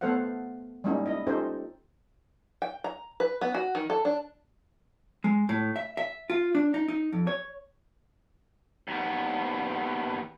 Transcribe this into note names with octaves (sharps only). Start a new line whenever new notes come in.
A3 B3 A4 C5 F5 F#5
G3 G#3 A#3 C#4 D#4 E4
E4 D#5
C#4 D#4 F4 G4 A4 C5
G5
A#5
B4
B3
F#4
D#3
A4
D4
G#3
A2
E5
E5
F4
D4
D#4
D#4
F2
C#5
D#2 B3